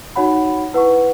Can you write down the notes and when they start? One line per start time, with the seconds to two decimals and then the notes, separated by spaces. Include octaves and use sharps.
0.15 D#4 F#4 C#5 F#5 B5
0.73 E4 B4 F#5 C#6